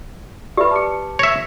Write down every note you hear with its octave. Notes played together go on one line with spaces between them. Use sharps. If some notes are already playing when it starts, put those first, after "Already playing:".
G4 B4 D5 E5 B5
A5 D6 C#7
C#5 E5 A#6